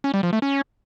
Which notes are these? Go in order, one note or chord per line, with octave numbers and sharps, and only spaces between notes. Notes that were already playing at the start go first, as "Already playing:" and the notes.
C#4
G3
F3
A3
C#4